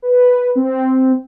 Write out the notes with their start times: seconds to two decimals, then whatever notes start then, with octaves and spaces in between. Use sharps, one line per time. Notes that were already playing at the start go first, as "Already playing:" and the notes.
0.02 B4
0.55 C4